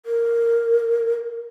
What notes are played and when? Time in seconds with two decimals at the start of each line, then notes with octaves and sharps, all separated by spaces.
0.06 A#4